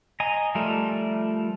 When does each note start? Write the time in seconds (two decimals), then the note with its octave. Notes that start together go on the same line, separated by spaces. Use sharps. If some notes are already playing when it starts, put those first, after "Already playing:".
0.20 D#5 G#5 A#5
0.55 F3 G3 A3 A4 A#4